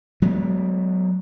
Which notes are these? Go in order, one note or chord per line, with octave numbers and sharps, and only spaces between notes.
F#3 G#3 A3 B3